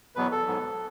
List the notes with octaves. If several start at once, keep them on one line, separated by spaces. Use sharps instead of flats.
E2 B2 F#3 B3 B4
A4
G#2 F#3 B3